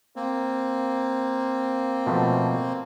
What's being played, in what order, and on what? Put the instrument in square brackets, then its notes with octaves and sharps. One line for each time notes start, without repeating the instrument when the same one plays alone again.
[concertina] A#3 C4
[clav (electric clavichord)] B2 F3 A3